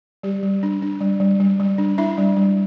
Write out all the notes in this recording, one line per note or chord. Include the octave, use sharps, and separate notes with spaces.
G3 G4
G3
D4
D4
G3
G3
G3
G3
D4
D4 E4 E5
G3
G3